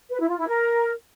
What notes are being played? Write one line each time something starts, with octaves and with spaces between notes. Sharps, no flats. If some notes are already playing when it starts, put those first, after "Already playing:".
B4
E4
F4
E4
A#4